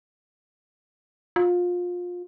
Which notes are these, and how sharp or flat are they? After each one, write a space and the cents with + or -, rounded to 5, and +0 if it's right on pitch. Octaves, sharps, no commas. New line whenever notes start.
F4 +25